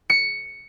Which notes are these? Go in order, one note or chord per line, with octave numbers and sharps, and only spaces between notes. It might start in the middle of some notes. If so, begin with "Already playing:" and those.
C#7